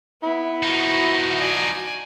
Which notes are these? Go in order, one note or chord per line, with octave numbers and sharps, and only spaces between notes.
B3 E4
F3 D#4 F#4
D5 G#5